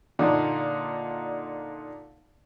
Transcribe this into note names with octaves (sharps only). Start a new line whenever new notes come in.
A#2 D3 D#4